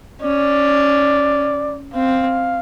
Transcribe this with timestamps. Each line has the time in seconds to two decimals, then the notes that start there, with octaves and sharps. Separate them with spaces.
0.22 C#4 D5
1.94 C4 F5